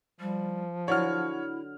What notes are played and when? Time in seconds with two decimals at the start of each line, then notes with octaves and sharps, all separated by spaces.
0.20 F3 G3
0.88 D3 F#3 E4 C#5 F6